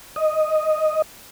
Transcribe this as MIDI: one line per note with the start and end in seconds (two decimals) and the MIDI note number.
0.16 1.02 75